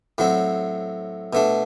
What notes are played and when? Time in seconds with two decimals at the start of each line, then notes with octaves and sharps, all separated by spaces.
0.18 A2 F#3 C4
1.33 B2 A3 D4